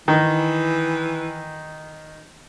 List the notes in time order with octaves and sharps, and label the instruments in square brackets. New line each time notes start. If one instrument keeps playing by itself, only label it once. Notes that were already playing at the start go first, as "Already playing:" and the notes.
[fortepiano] D#3 [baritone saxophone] E3